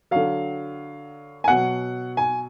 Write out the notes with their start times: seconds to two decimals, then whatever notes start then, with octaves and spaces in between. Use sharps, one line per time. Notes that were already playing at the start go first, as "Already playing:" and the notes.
0.11 D3 F#3 F5
1.44 G#5
1.48 B2 F#3 F#5
2.17 G#5